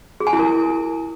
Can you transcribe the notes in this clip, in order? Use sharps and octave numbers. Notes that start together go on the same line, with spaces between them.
G#4
G#5
E4
A#4